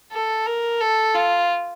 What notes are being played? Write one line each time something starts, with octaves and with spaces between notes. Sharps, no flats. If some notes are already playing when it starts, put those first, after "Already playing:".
A4
A#4
A4
F4